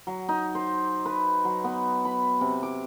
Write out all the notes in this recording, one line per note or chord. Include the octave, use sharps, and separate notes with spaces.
F#3
D#4
C5
B4
F#3
B3
B5
C3
D6